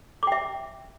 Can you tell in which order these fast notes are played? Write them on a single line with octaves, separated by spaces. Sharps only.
D6 G5 E5